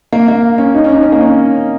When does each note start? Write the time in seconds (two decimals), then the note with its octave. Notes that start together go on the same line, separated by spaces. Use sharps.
0.13 A#3
0.28 A#3
0.58 C#4
0.74 D#4
0.84 C#4
0.94 D#4
1.03 C#4
1.12 A#3
1.21 C#4